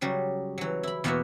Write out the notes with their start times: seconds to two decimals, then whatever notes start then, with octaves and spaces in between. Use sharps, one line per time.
0.01 C#3 F#3 G3
0.58 E3 F#3
0.83 E4 B5
1.04 E2 B2 A#3 B3 F#4 E5